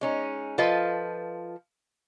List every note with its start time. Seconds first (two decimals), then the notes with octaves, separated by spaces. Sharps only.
0.01 G#3 C#4 D#4
0.58 F3 F4 A4 B4 D#5